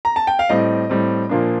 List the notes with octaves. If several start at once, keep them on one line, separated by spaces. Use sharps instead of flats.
A#5
A5
G5
F5
A2 G3 C4 D#5
A2 G3 C4
A#2 F3 A#3 D4